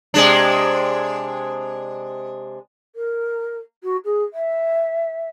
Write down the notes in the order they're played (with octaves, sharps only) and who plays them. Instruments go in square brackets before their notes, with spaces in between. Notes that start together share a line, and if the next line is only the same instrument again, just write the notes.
[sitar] C3 G#3 D4
[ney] A#4
F#4
G#4
E5